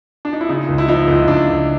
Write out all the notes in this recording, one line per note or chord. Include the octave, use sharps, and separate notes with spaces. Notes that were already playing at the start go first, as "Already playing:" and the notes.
D4
D#4
E4
C#3 D#4 F4
C#2
E4
F3 D#4 F4
C#2
C#2 D4
C#2